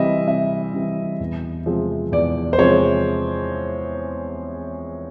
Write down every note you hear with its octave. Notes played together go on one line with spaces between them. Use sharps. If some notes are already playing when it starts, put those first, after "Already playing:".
Already playing: C3 E3 G3 C4 D#5 E5
C3 E5
E3 G3 C4
E2
C3 F3 G#3 C4
E2 D5
C5
C3 F3 G#3 C4 C#5